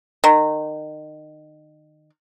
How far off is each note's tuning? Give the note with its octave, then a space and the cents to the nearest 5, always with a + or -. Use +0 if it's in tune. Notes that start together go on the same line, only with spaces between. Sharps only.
D#3 -25